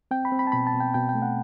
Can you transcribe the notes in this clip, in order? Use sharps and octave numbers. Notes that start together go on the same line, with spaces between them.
C4 G5
B5
C4
B5
A5
B2 B5
A5
B2
G5
B2 G5
G5
A3
F#5